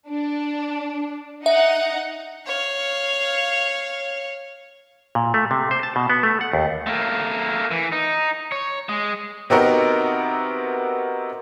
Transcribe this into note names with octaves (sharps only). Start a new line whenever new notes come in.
D4
D#4 E5 F#5
C#5 F5
A#2
A3
C3
C5
A5
B2
B3
A3
F#5
D#2
A3 A#3
E3
D#4
C#5
G#3
C3 B3 C4 D#4 F#4 A#4